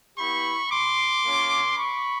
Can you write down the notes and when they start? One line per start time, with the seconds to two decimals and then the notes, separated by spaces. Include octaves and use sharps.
0.18 B3 E4 G4 B5 C#6
0.71 C6 D6
1.25 A#3 C#4 F4
1.78 B5 C#6